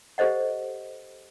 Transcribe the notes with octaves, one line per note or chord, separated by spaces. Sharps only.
G4 A4 C5 D#5 F#5